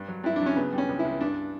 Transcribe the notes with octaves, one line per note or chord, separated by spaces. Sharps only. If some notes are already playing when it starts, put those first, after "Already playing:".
Already playing: G2
F#3
G2 E4
F#3 D4
C#4
C#3 B3
G3
C#4
C#2
E4
C#2
G2 D4